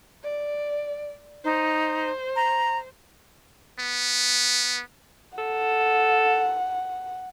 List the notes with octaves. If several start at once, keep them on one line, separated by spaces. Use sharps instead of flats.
D5
D#4 C5
A#5
B3
A4 F#5